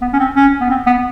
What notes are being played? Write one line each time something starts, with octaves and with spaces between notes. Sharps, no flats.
B3
C#4
C4
C#4
B3
C4
B3